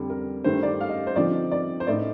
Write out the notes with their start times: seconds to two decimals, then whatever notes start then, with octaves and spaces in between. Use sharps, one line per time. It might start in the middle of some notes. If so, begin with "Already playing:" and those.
Already playing: F2 D3 G3
0.10 A#4
0.44 G2 D#3 A3 C5
0.63 D5
0.81 F5
0.89 D#5
1.07 C5
1.16 D3 F3 C4 D#4 D5
1.51 D5
1.80 C5
1.87 A2 A3 D#4 D5